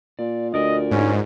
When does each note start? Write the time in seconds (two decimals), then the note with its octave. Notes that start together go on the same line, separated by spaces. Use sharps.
0.19 A#2 D5
0.54 D2 F4 A#4 D5 D#5
0.91 G#2 C#4